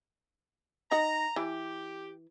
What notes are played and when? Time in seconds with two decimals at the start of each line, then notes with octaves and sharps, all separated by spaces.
0.91 D#4 F#5 A#5
1.36 E3 G4